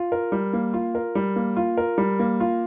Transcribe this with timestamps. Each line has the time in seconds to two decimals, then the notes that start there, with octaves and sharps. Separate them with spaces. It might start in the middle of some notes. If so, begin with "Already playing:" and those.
Already playing: F4
0.12 A#4
0.32 G3
0.53 A#3
0.73 F4
0.95 A#4
1.15 G3
1.36 A#3
1.57 F4
1.77 A#4
1.98 G3
2.19 A#3
2.40 F4